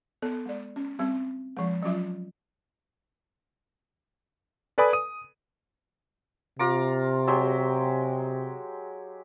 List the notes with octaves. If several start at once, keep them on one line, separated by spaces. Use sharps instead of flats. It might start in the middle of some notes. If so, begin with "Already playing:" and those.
B3 A4
G#3 D5
C#4
G3 C4
F3 G#3
F#3 C#4 F4 E5
A4 B4 D5 G#5 B5 D#6
D#6 D#7
C3 F4 A#5 D6
F#3 G#3 G4